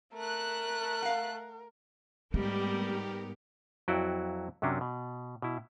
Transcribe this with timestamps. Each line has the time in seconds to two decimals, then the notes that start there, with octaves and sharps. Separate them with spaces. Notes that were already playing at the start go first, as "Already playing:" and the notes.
0.16 A3 A#4 F#6
1.02 F5 F#5
2.34 G#2 G3 A3 B3 C4 G4 A#4
3.88 F2 F#3 E4 F#4 D5 G5
4.62 F#2 C3 F#3 C#4 D4
4.81 B2
5.42 B2 E4